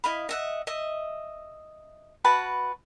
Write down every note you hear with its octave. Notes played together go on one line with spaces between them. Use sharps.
E4 D#5 F5 B5
D#5 E5 F#5
D#5 E5
F#4 B4 A5 B5